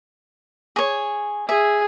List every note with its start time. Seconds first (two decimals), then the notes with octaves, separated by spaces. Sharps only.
0.76 G#4 C#5
1.49 G#4 E5